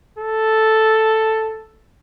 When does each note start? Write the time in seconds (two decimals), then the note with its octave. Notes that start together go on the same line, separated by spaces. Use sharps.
0.18 A4